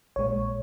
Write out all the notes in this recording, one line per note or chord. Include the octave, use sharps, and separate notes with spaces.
A#1 A#2 G#3 C#5